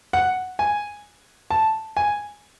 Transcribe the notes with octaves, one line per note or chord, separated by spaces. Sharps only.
F#5
G#5
A5
G#5